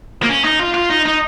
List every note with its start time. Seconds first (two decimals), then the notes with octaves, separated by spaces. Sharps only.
0.23 A#3
0.29 C#4
0.45 D#4
0.59 F4
0.74 F4
0.90 D#4
1.05 D#4